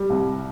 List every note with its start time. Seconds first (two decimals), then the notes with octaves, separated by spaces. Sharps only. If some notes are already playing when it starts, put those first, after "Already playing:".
Already playing: G3
0.10 C2